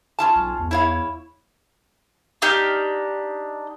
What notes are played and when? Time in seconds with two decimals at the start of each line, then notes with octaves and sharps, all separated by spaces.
0.19 C#4 F4 A5
0.35 B1
0.59 E2
0.71 E4 C#5 F5
2.42 D4 D#4 G4 F6